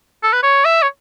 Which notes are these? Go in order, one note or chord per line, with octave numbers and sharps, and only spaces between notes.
A4
B4
C#5
E5
C#5